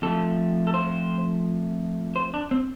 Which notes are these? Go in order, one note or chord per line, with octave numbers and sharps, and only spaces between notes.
F2 F3 A3 A4
A4
C5
C5
D4
C4